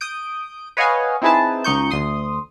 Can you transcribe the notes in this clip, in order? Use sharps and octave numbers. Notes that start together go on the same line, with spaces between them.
D#6 G6 D7
B4 C#5 D#5 F5 F#5 G#5
C4 D#4 E4 G#4 B4 A5
C#2 D#4 C#6 G6
D2 C6 D#6